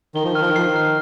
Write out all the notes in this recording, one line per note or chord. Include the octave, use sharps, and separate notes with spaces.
D#3 G7
F3
D#3 F6
F3
D#3
F3 C7
D#3
F6